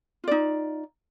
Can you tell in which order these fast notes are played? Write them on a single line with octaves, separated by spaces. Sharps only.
F4 D5 D#4